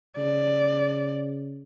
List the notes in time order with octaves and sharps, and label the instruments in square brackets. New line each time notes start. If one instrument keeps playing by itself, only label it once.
[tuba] C#3 [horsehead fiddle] D5